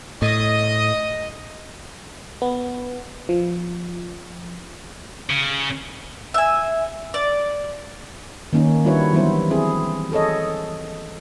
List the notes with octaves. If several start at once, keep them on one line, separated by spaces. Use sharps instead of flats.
A2 D#5
B3
F3
C#3
E5 G#5
D5
D#3 A#3 C#4 D#4
G3 D4 E4 F#4 B4 C#5
E3 F#3 G3 B3 E4 C5
C4 E4 G#4
G#4 A4 C#5 D#5